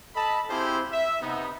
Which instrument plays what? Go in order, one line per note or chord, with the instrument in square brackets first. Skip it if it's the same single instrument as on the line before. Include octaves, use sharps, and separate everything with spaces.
[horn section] A4 D#5 A5 B5
C4 E4 F4 G4 G#4 C5
E5
C3 B3 D#4